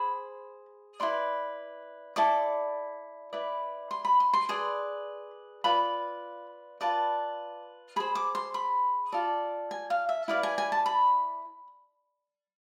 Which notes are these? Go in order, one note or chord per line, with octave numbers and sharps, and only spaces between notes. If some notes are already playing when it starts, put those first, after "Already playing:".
Already playing: G#4 C5 B5
E4 B4 D5 C6
E4 A4 D5 D6
E4 B4 D5
C6
B5
C6
C6
G#4 B4 D5 C6
F4 B4 D5 B5
F4 B4 D5 A5
G#4 C5 B5
D6
C6
B5
F4 A4 D5
G#5
F5
E5
E4 B4 D5 F5
G#5
G#5
A5
B5